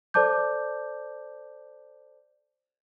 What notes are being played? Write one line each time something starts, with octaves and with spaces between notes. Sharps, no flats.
A4 C5 D5 A5 D6 G6